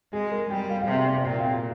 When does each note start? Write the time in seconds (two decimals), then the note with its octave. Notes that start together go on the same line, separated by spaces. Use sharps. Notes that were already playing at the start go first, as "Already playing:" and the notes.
0.13 G#3 G#4
0.31 A#4
0.50 G3 G5
0.69 F5
0.81 F5
0.87 C3 G5
1.06 D5
1.25 A#2 G5
1.39 F5
1.44 G5